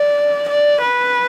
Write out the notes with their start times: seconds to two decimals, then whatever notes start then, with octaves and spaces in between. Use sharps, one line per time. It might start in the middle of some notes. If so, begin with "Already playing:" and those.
Already playing: D5
0.48 D5
0.81 B4